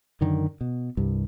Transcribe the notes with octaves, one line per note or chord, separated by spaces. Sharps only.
F#2 D3 D#3
B2
C2 G2